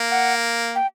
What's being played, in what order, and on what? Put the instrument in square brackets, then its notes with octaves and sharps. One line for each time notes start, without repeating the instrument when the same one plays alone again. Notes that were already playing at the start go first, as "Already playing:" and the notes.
Already playing: [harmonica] A#3
[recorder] F#5
G5